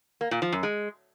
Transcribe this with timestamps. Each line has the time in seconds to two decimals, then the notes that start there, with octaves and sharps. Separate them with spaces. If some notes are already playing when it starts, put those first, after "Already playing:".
0.21 A#3
0.31 A#2
0.42 F3
0.52 F#2
0.63 G#3